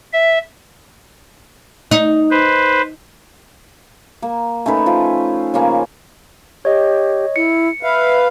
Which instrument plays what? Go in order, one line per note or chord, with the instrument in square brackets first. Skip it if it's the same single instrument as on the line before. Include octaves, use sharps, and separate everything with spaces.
[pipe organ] E5
[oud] D#4
[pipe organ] B4 C5
[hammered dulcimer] A#3
A3 C#4 D#4 B4
F3 F4
C#3 F3 A#3 C#4
[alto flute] G4 [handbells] C#5 D#5
[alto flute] E4 [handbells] C#7
[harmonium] B4 F5 [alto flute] E5